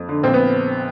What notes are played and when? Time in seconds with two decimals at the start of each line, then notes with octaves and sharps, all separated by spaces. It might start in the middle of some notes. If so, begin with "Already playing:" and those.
Already playing: F2
0.09 D3
0.23 A#1 C4
0.34 B3